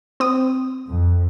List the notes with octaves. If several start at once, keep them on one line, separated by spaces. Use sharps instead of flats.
C4 D#6
F2